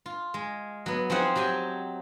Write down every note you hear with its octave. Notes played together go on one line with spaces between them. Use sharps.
F4
G#3
F#3 B3
F3 C4 D#4 G#4 F#5
F#3 G4 G5 G#5